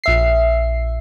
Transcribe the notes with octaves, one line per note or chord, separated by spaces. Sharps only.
A#1 E5 C7